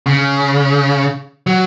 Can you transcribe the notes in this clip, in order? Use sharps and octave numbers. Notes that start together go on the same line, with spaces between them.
C#3
F#3